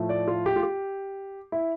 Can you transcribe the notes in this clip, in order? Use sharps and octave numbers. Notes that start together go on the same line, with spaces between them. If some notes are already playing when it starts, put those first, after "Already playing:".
Already playing: A2 F3 A3
D5
F4
G4
F4
G4
E4